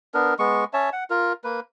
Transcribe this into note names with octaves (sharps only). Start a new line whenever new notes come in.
B3 D4 A#4
G#3 B3 C#6
C#4 C#5 E5 A5
F#5
F4 A#4
A#3 B4